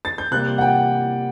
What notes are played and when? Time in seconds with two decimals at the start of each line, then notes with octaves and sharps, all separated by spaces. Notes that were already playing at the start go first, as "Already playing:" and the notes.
0.05 A6
0.18 G6
0.31 C3 G3 A#3 F#6
0.58 F#5
0.61 G5